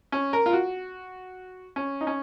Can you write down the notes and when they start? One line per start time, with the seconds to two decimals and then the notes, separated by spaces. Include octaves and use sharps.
0.12 C#4
0.33 A#4
0.46 F4
0.53 F#4
1.76 C#4
2.01 D#4
2.07 C#4